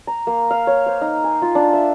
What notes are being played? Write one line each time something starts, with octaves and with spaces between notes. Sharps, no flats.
A#5
A#3
F5
C#5
C5
D#4
G#5
F4
D4
E5